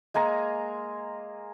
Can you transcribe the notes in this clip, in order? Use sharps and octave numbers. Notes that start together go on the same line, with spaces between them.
G#3 A#3 G#5 A#5